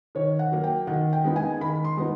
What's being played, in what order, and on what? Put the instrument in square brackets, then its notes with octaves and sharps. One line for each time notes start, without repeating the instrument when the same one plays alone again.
[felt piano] D#3 C#5
F#5
F#3 A#3
G5
D#3 F#5
G5
G#3 B3 D#4
G#5
D#3 B5
C6
G#3 B3 D#4